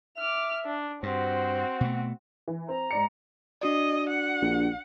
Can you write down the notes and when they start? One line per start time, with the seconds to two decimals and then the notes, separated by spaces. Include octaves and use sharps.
0.18 E5 D6 F6
0.65 D4
1.03 G2 C4 F#4 C5
1.81 B2 A3
2.48 E3
2.69 C4 A#5
2.91 G#2 D5 C#7
3.61 D4 F#4 D5 D#5
4.09 F#5
4.41 A#1